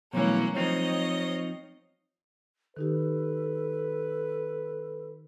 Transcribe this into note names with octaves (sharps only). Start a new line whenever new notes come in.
B2 E3 F#3 G3 A3 A#3 C#4
F3 C4 D#4 C#5 D#5
D#3 D#4 G4 A4 B4